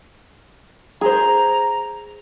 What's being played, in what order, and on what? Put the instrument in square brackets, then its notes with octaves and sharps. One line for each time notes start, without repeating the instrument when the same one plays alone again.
[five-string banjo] G#4 C5 [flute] A#5